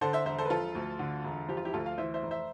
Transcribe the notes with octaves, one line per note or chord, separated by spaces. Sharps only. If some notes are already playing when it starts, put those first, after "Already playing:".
D3 A4 C5
C5 E5
E1 C5 E5
A4 C5
B4
F3 F4 A4
D2
D3
E1
F3 G4
F4
E4 G4
D2 F4 A4
F5
E3 C5 E5
C5 E5
F1
C5 E5